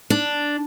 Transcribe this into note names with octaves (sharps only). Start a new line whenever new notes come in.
D4